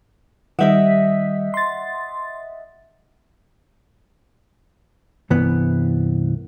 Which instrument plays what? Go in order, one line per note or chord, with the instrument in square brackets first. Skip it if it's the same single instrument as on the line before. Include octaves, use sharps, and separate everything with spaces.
[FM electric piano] D#3 G3 B6 [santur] D#5 E5 F#5
[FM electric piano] C6 A6
[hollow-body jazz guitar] C2 G2 E3 B3